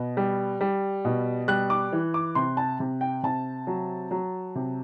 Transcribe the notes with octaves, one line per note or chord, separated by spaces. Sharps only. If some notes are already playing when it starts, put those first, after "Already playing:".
Already playing: B2
G3
G3
B2
G3 F#6
D6
E3
D6
C3 C6
A5
C3
G5
C3 A5
F#3
F#3
C3